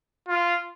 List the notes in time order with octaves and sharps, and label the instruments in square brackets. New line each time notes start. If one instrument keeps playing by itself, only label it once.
[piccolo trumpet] F4